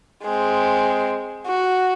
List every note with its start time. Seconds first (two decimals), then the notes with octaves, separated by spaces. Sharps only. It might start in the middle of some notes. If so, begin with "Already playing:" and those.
0.23 G#3 C4
1.47 F#4